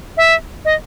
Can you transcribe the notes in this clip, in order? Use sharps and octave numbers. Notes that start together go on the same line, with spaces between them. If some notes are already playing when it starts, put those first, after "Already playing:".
E5
D#5